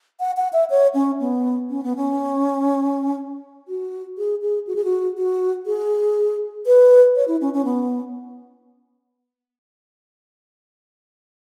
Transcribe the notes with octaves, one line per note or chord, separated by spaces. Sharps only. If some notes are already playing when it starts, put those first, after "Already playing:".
F#5
F#5
E5
C#5
C#4
B3
C#4
B3
C#4
F#4
G#4
G#4
F#4
G#4
F#4
F#4
G#4
B4
C#5
E4
C#4
C#4
B3